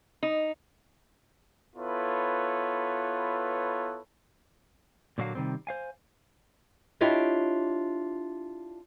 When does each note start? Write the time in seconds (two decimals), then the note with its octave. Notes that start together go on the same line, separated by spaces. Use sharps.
0.23 D#4
1.76 B3 E4 F4 A4 B4 C#5
5.18 A#2 D3 F#3 A#3 F#4 F5
5.35 C3 D#3 G3 C4
5.67 C5 F5 G#5
7.01 D4 E4 F4 G4 C#5 D#5